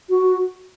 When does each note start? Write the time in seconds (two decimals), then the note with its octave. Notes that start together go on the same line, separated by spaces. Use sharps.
0.10 F#4